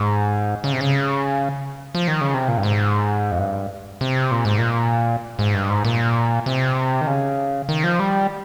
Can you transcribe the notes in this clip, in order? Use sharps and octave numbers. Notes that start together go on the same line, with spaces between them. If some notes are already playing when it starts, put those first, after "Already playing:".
Already playing: G#2
C#3
C3
C#3
F3
D#3
C#3
C3
A#2
G2
G#2
F2
G2
C3
A#2
G#2
A#2
G#2
G2
G#2
A#2
C3
D#3
C#3
D#3
F3
G3